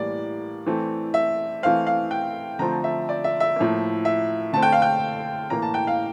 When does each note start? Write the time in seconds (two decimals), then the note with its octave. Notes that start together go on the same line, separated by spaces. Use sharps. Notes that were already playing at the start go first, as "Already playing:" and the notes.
Already playing: A2 E3 G3 A#3 D5
0.67 E3 A3 C4
1.14 E5
1.63 E3 A3 C4 F5
1.87 F5
2.11 G5
2.59 D3 F3 A3 C4 A#5
2.84 E5
3.09 D5
3.24 E5
3.40 E5
3.56 A2 F3 A#3
4.05 E5
4.53 D3 A3 C4 A5
4.63 G5
4.72 F5
4.82 G5
5.50 A2 E3 A#3 A#5
5.62 A5
5.74 G5
5.87 F5